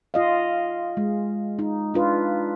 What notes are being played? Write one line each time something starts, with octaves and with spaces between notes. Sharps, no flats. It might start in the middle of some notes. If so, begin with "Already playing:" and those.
F4 D#5 F5
G#3
D#4
D4 F4 B4